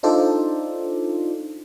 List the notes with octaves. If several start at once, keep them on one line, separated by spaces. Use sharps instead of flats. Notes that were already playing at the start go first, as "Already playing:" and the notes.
D4 D#4 F4 A4 C5 D5